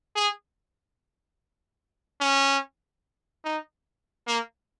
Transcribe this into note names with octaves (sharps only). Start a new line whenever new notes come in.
G#4
C#4
D#4
A#3